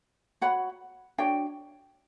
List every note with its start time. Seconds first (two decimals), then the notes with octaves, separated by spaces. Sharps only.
0.41 F#4 C#5 F#5 B5
1.18 D4 F#4 C#5 G5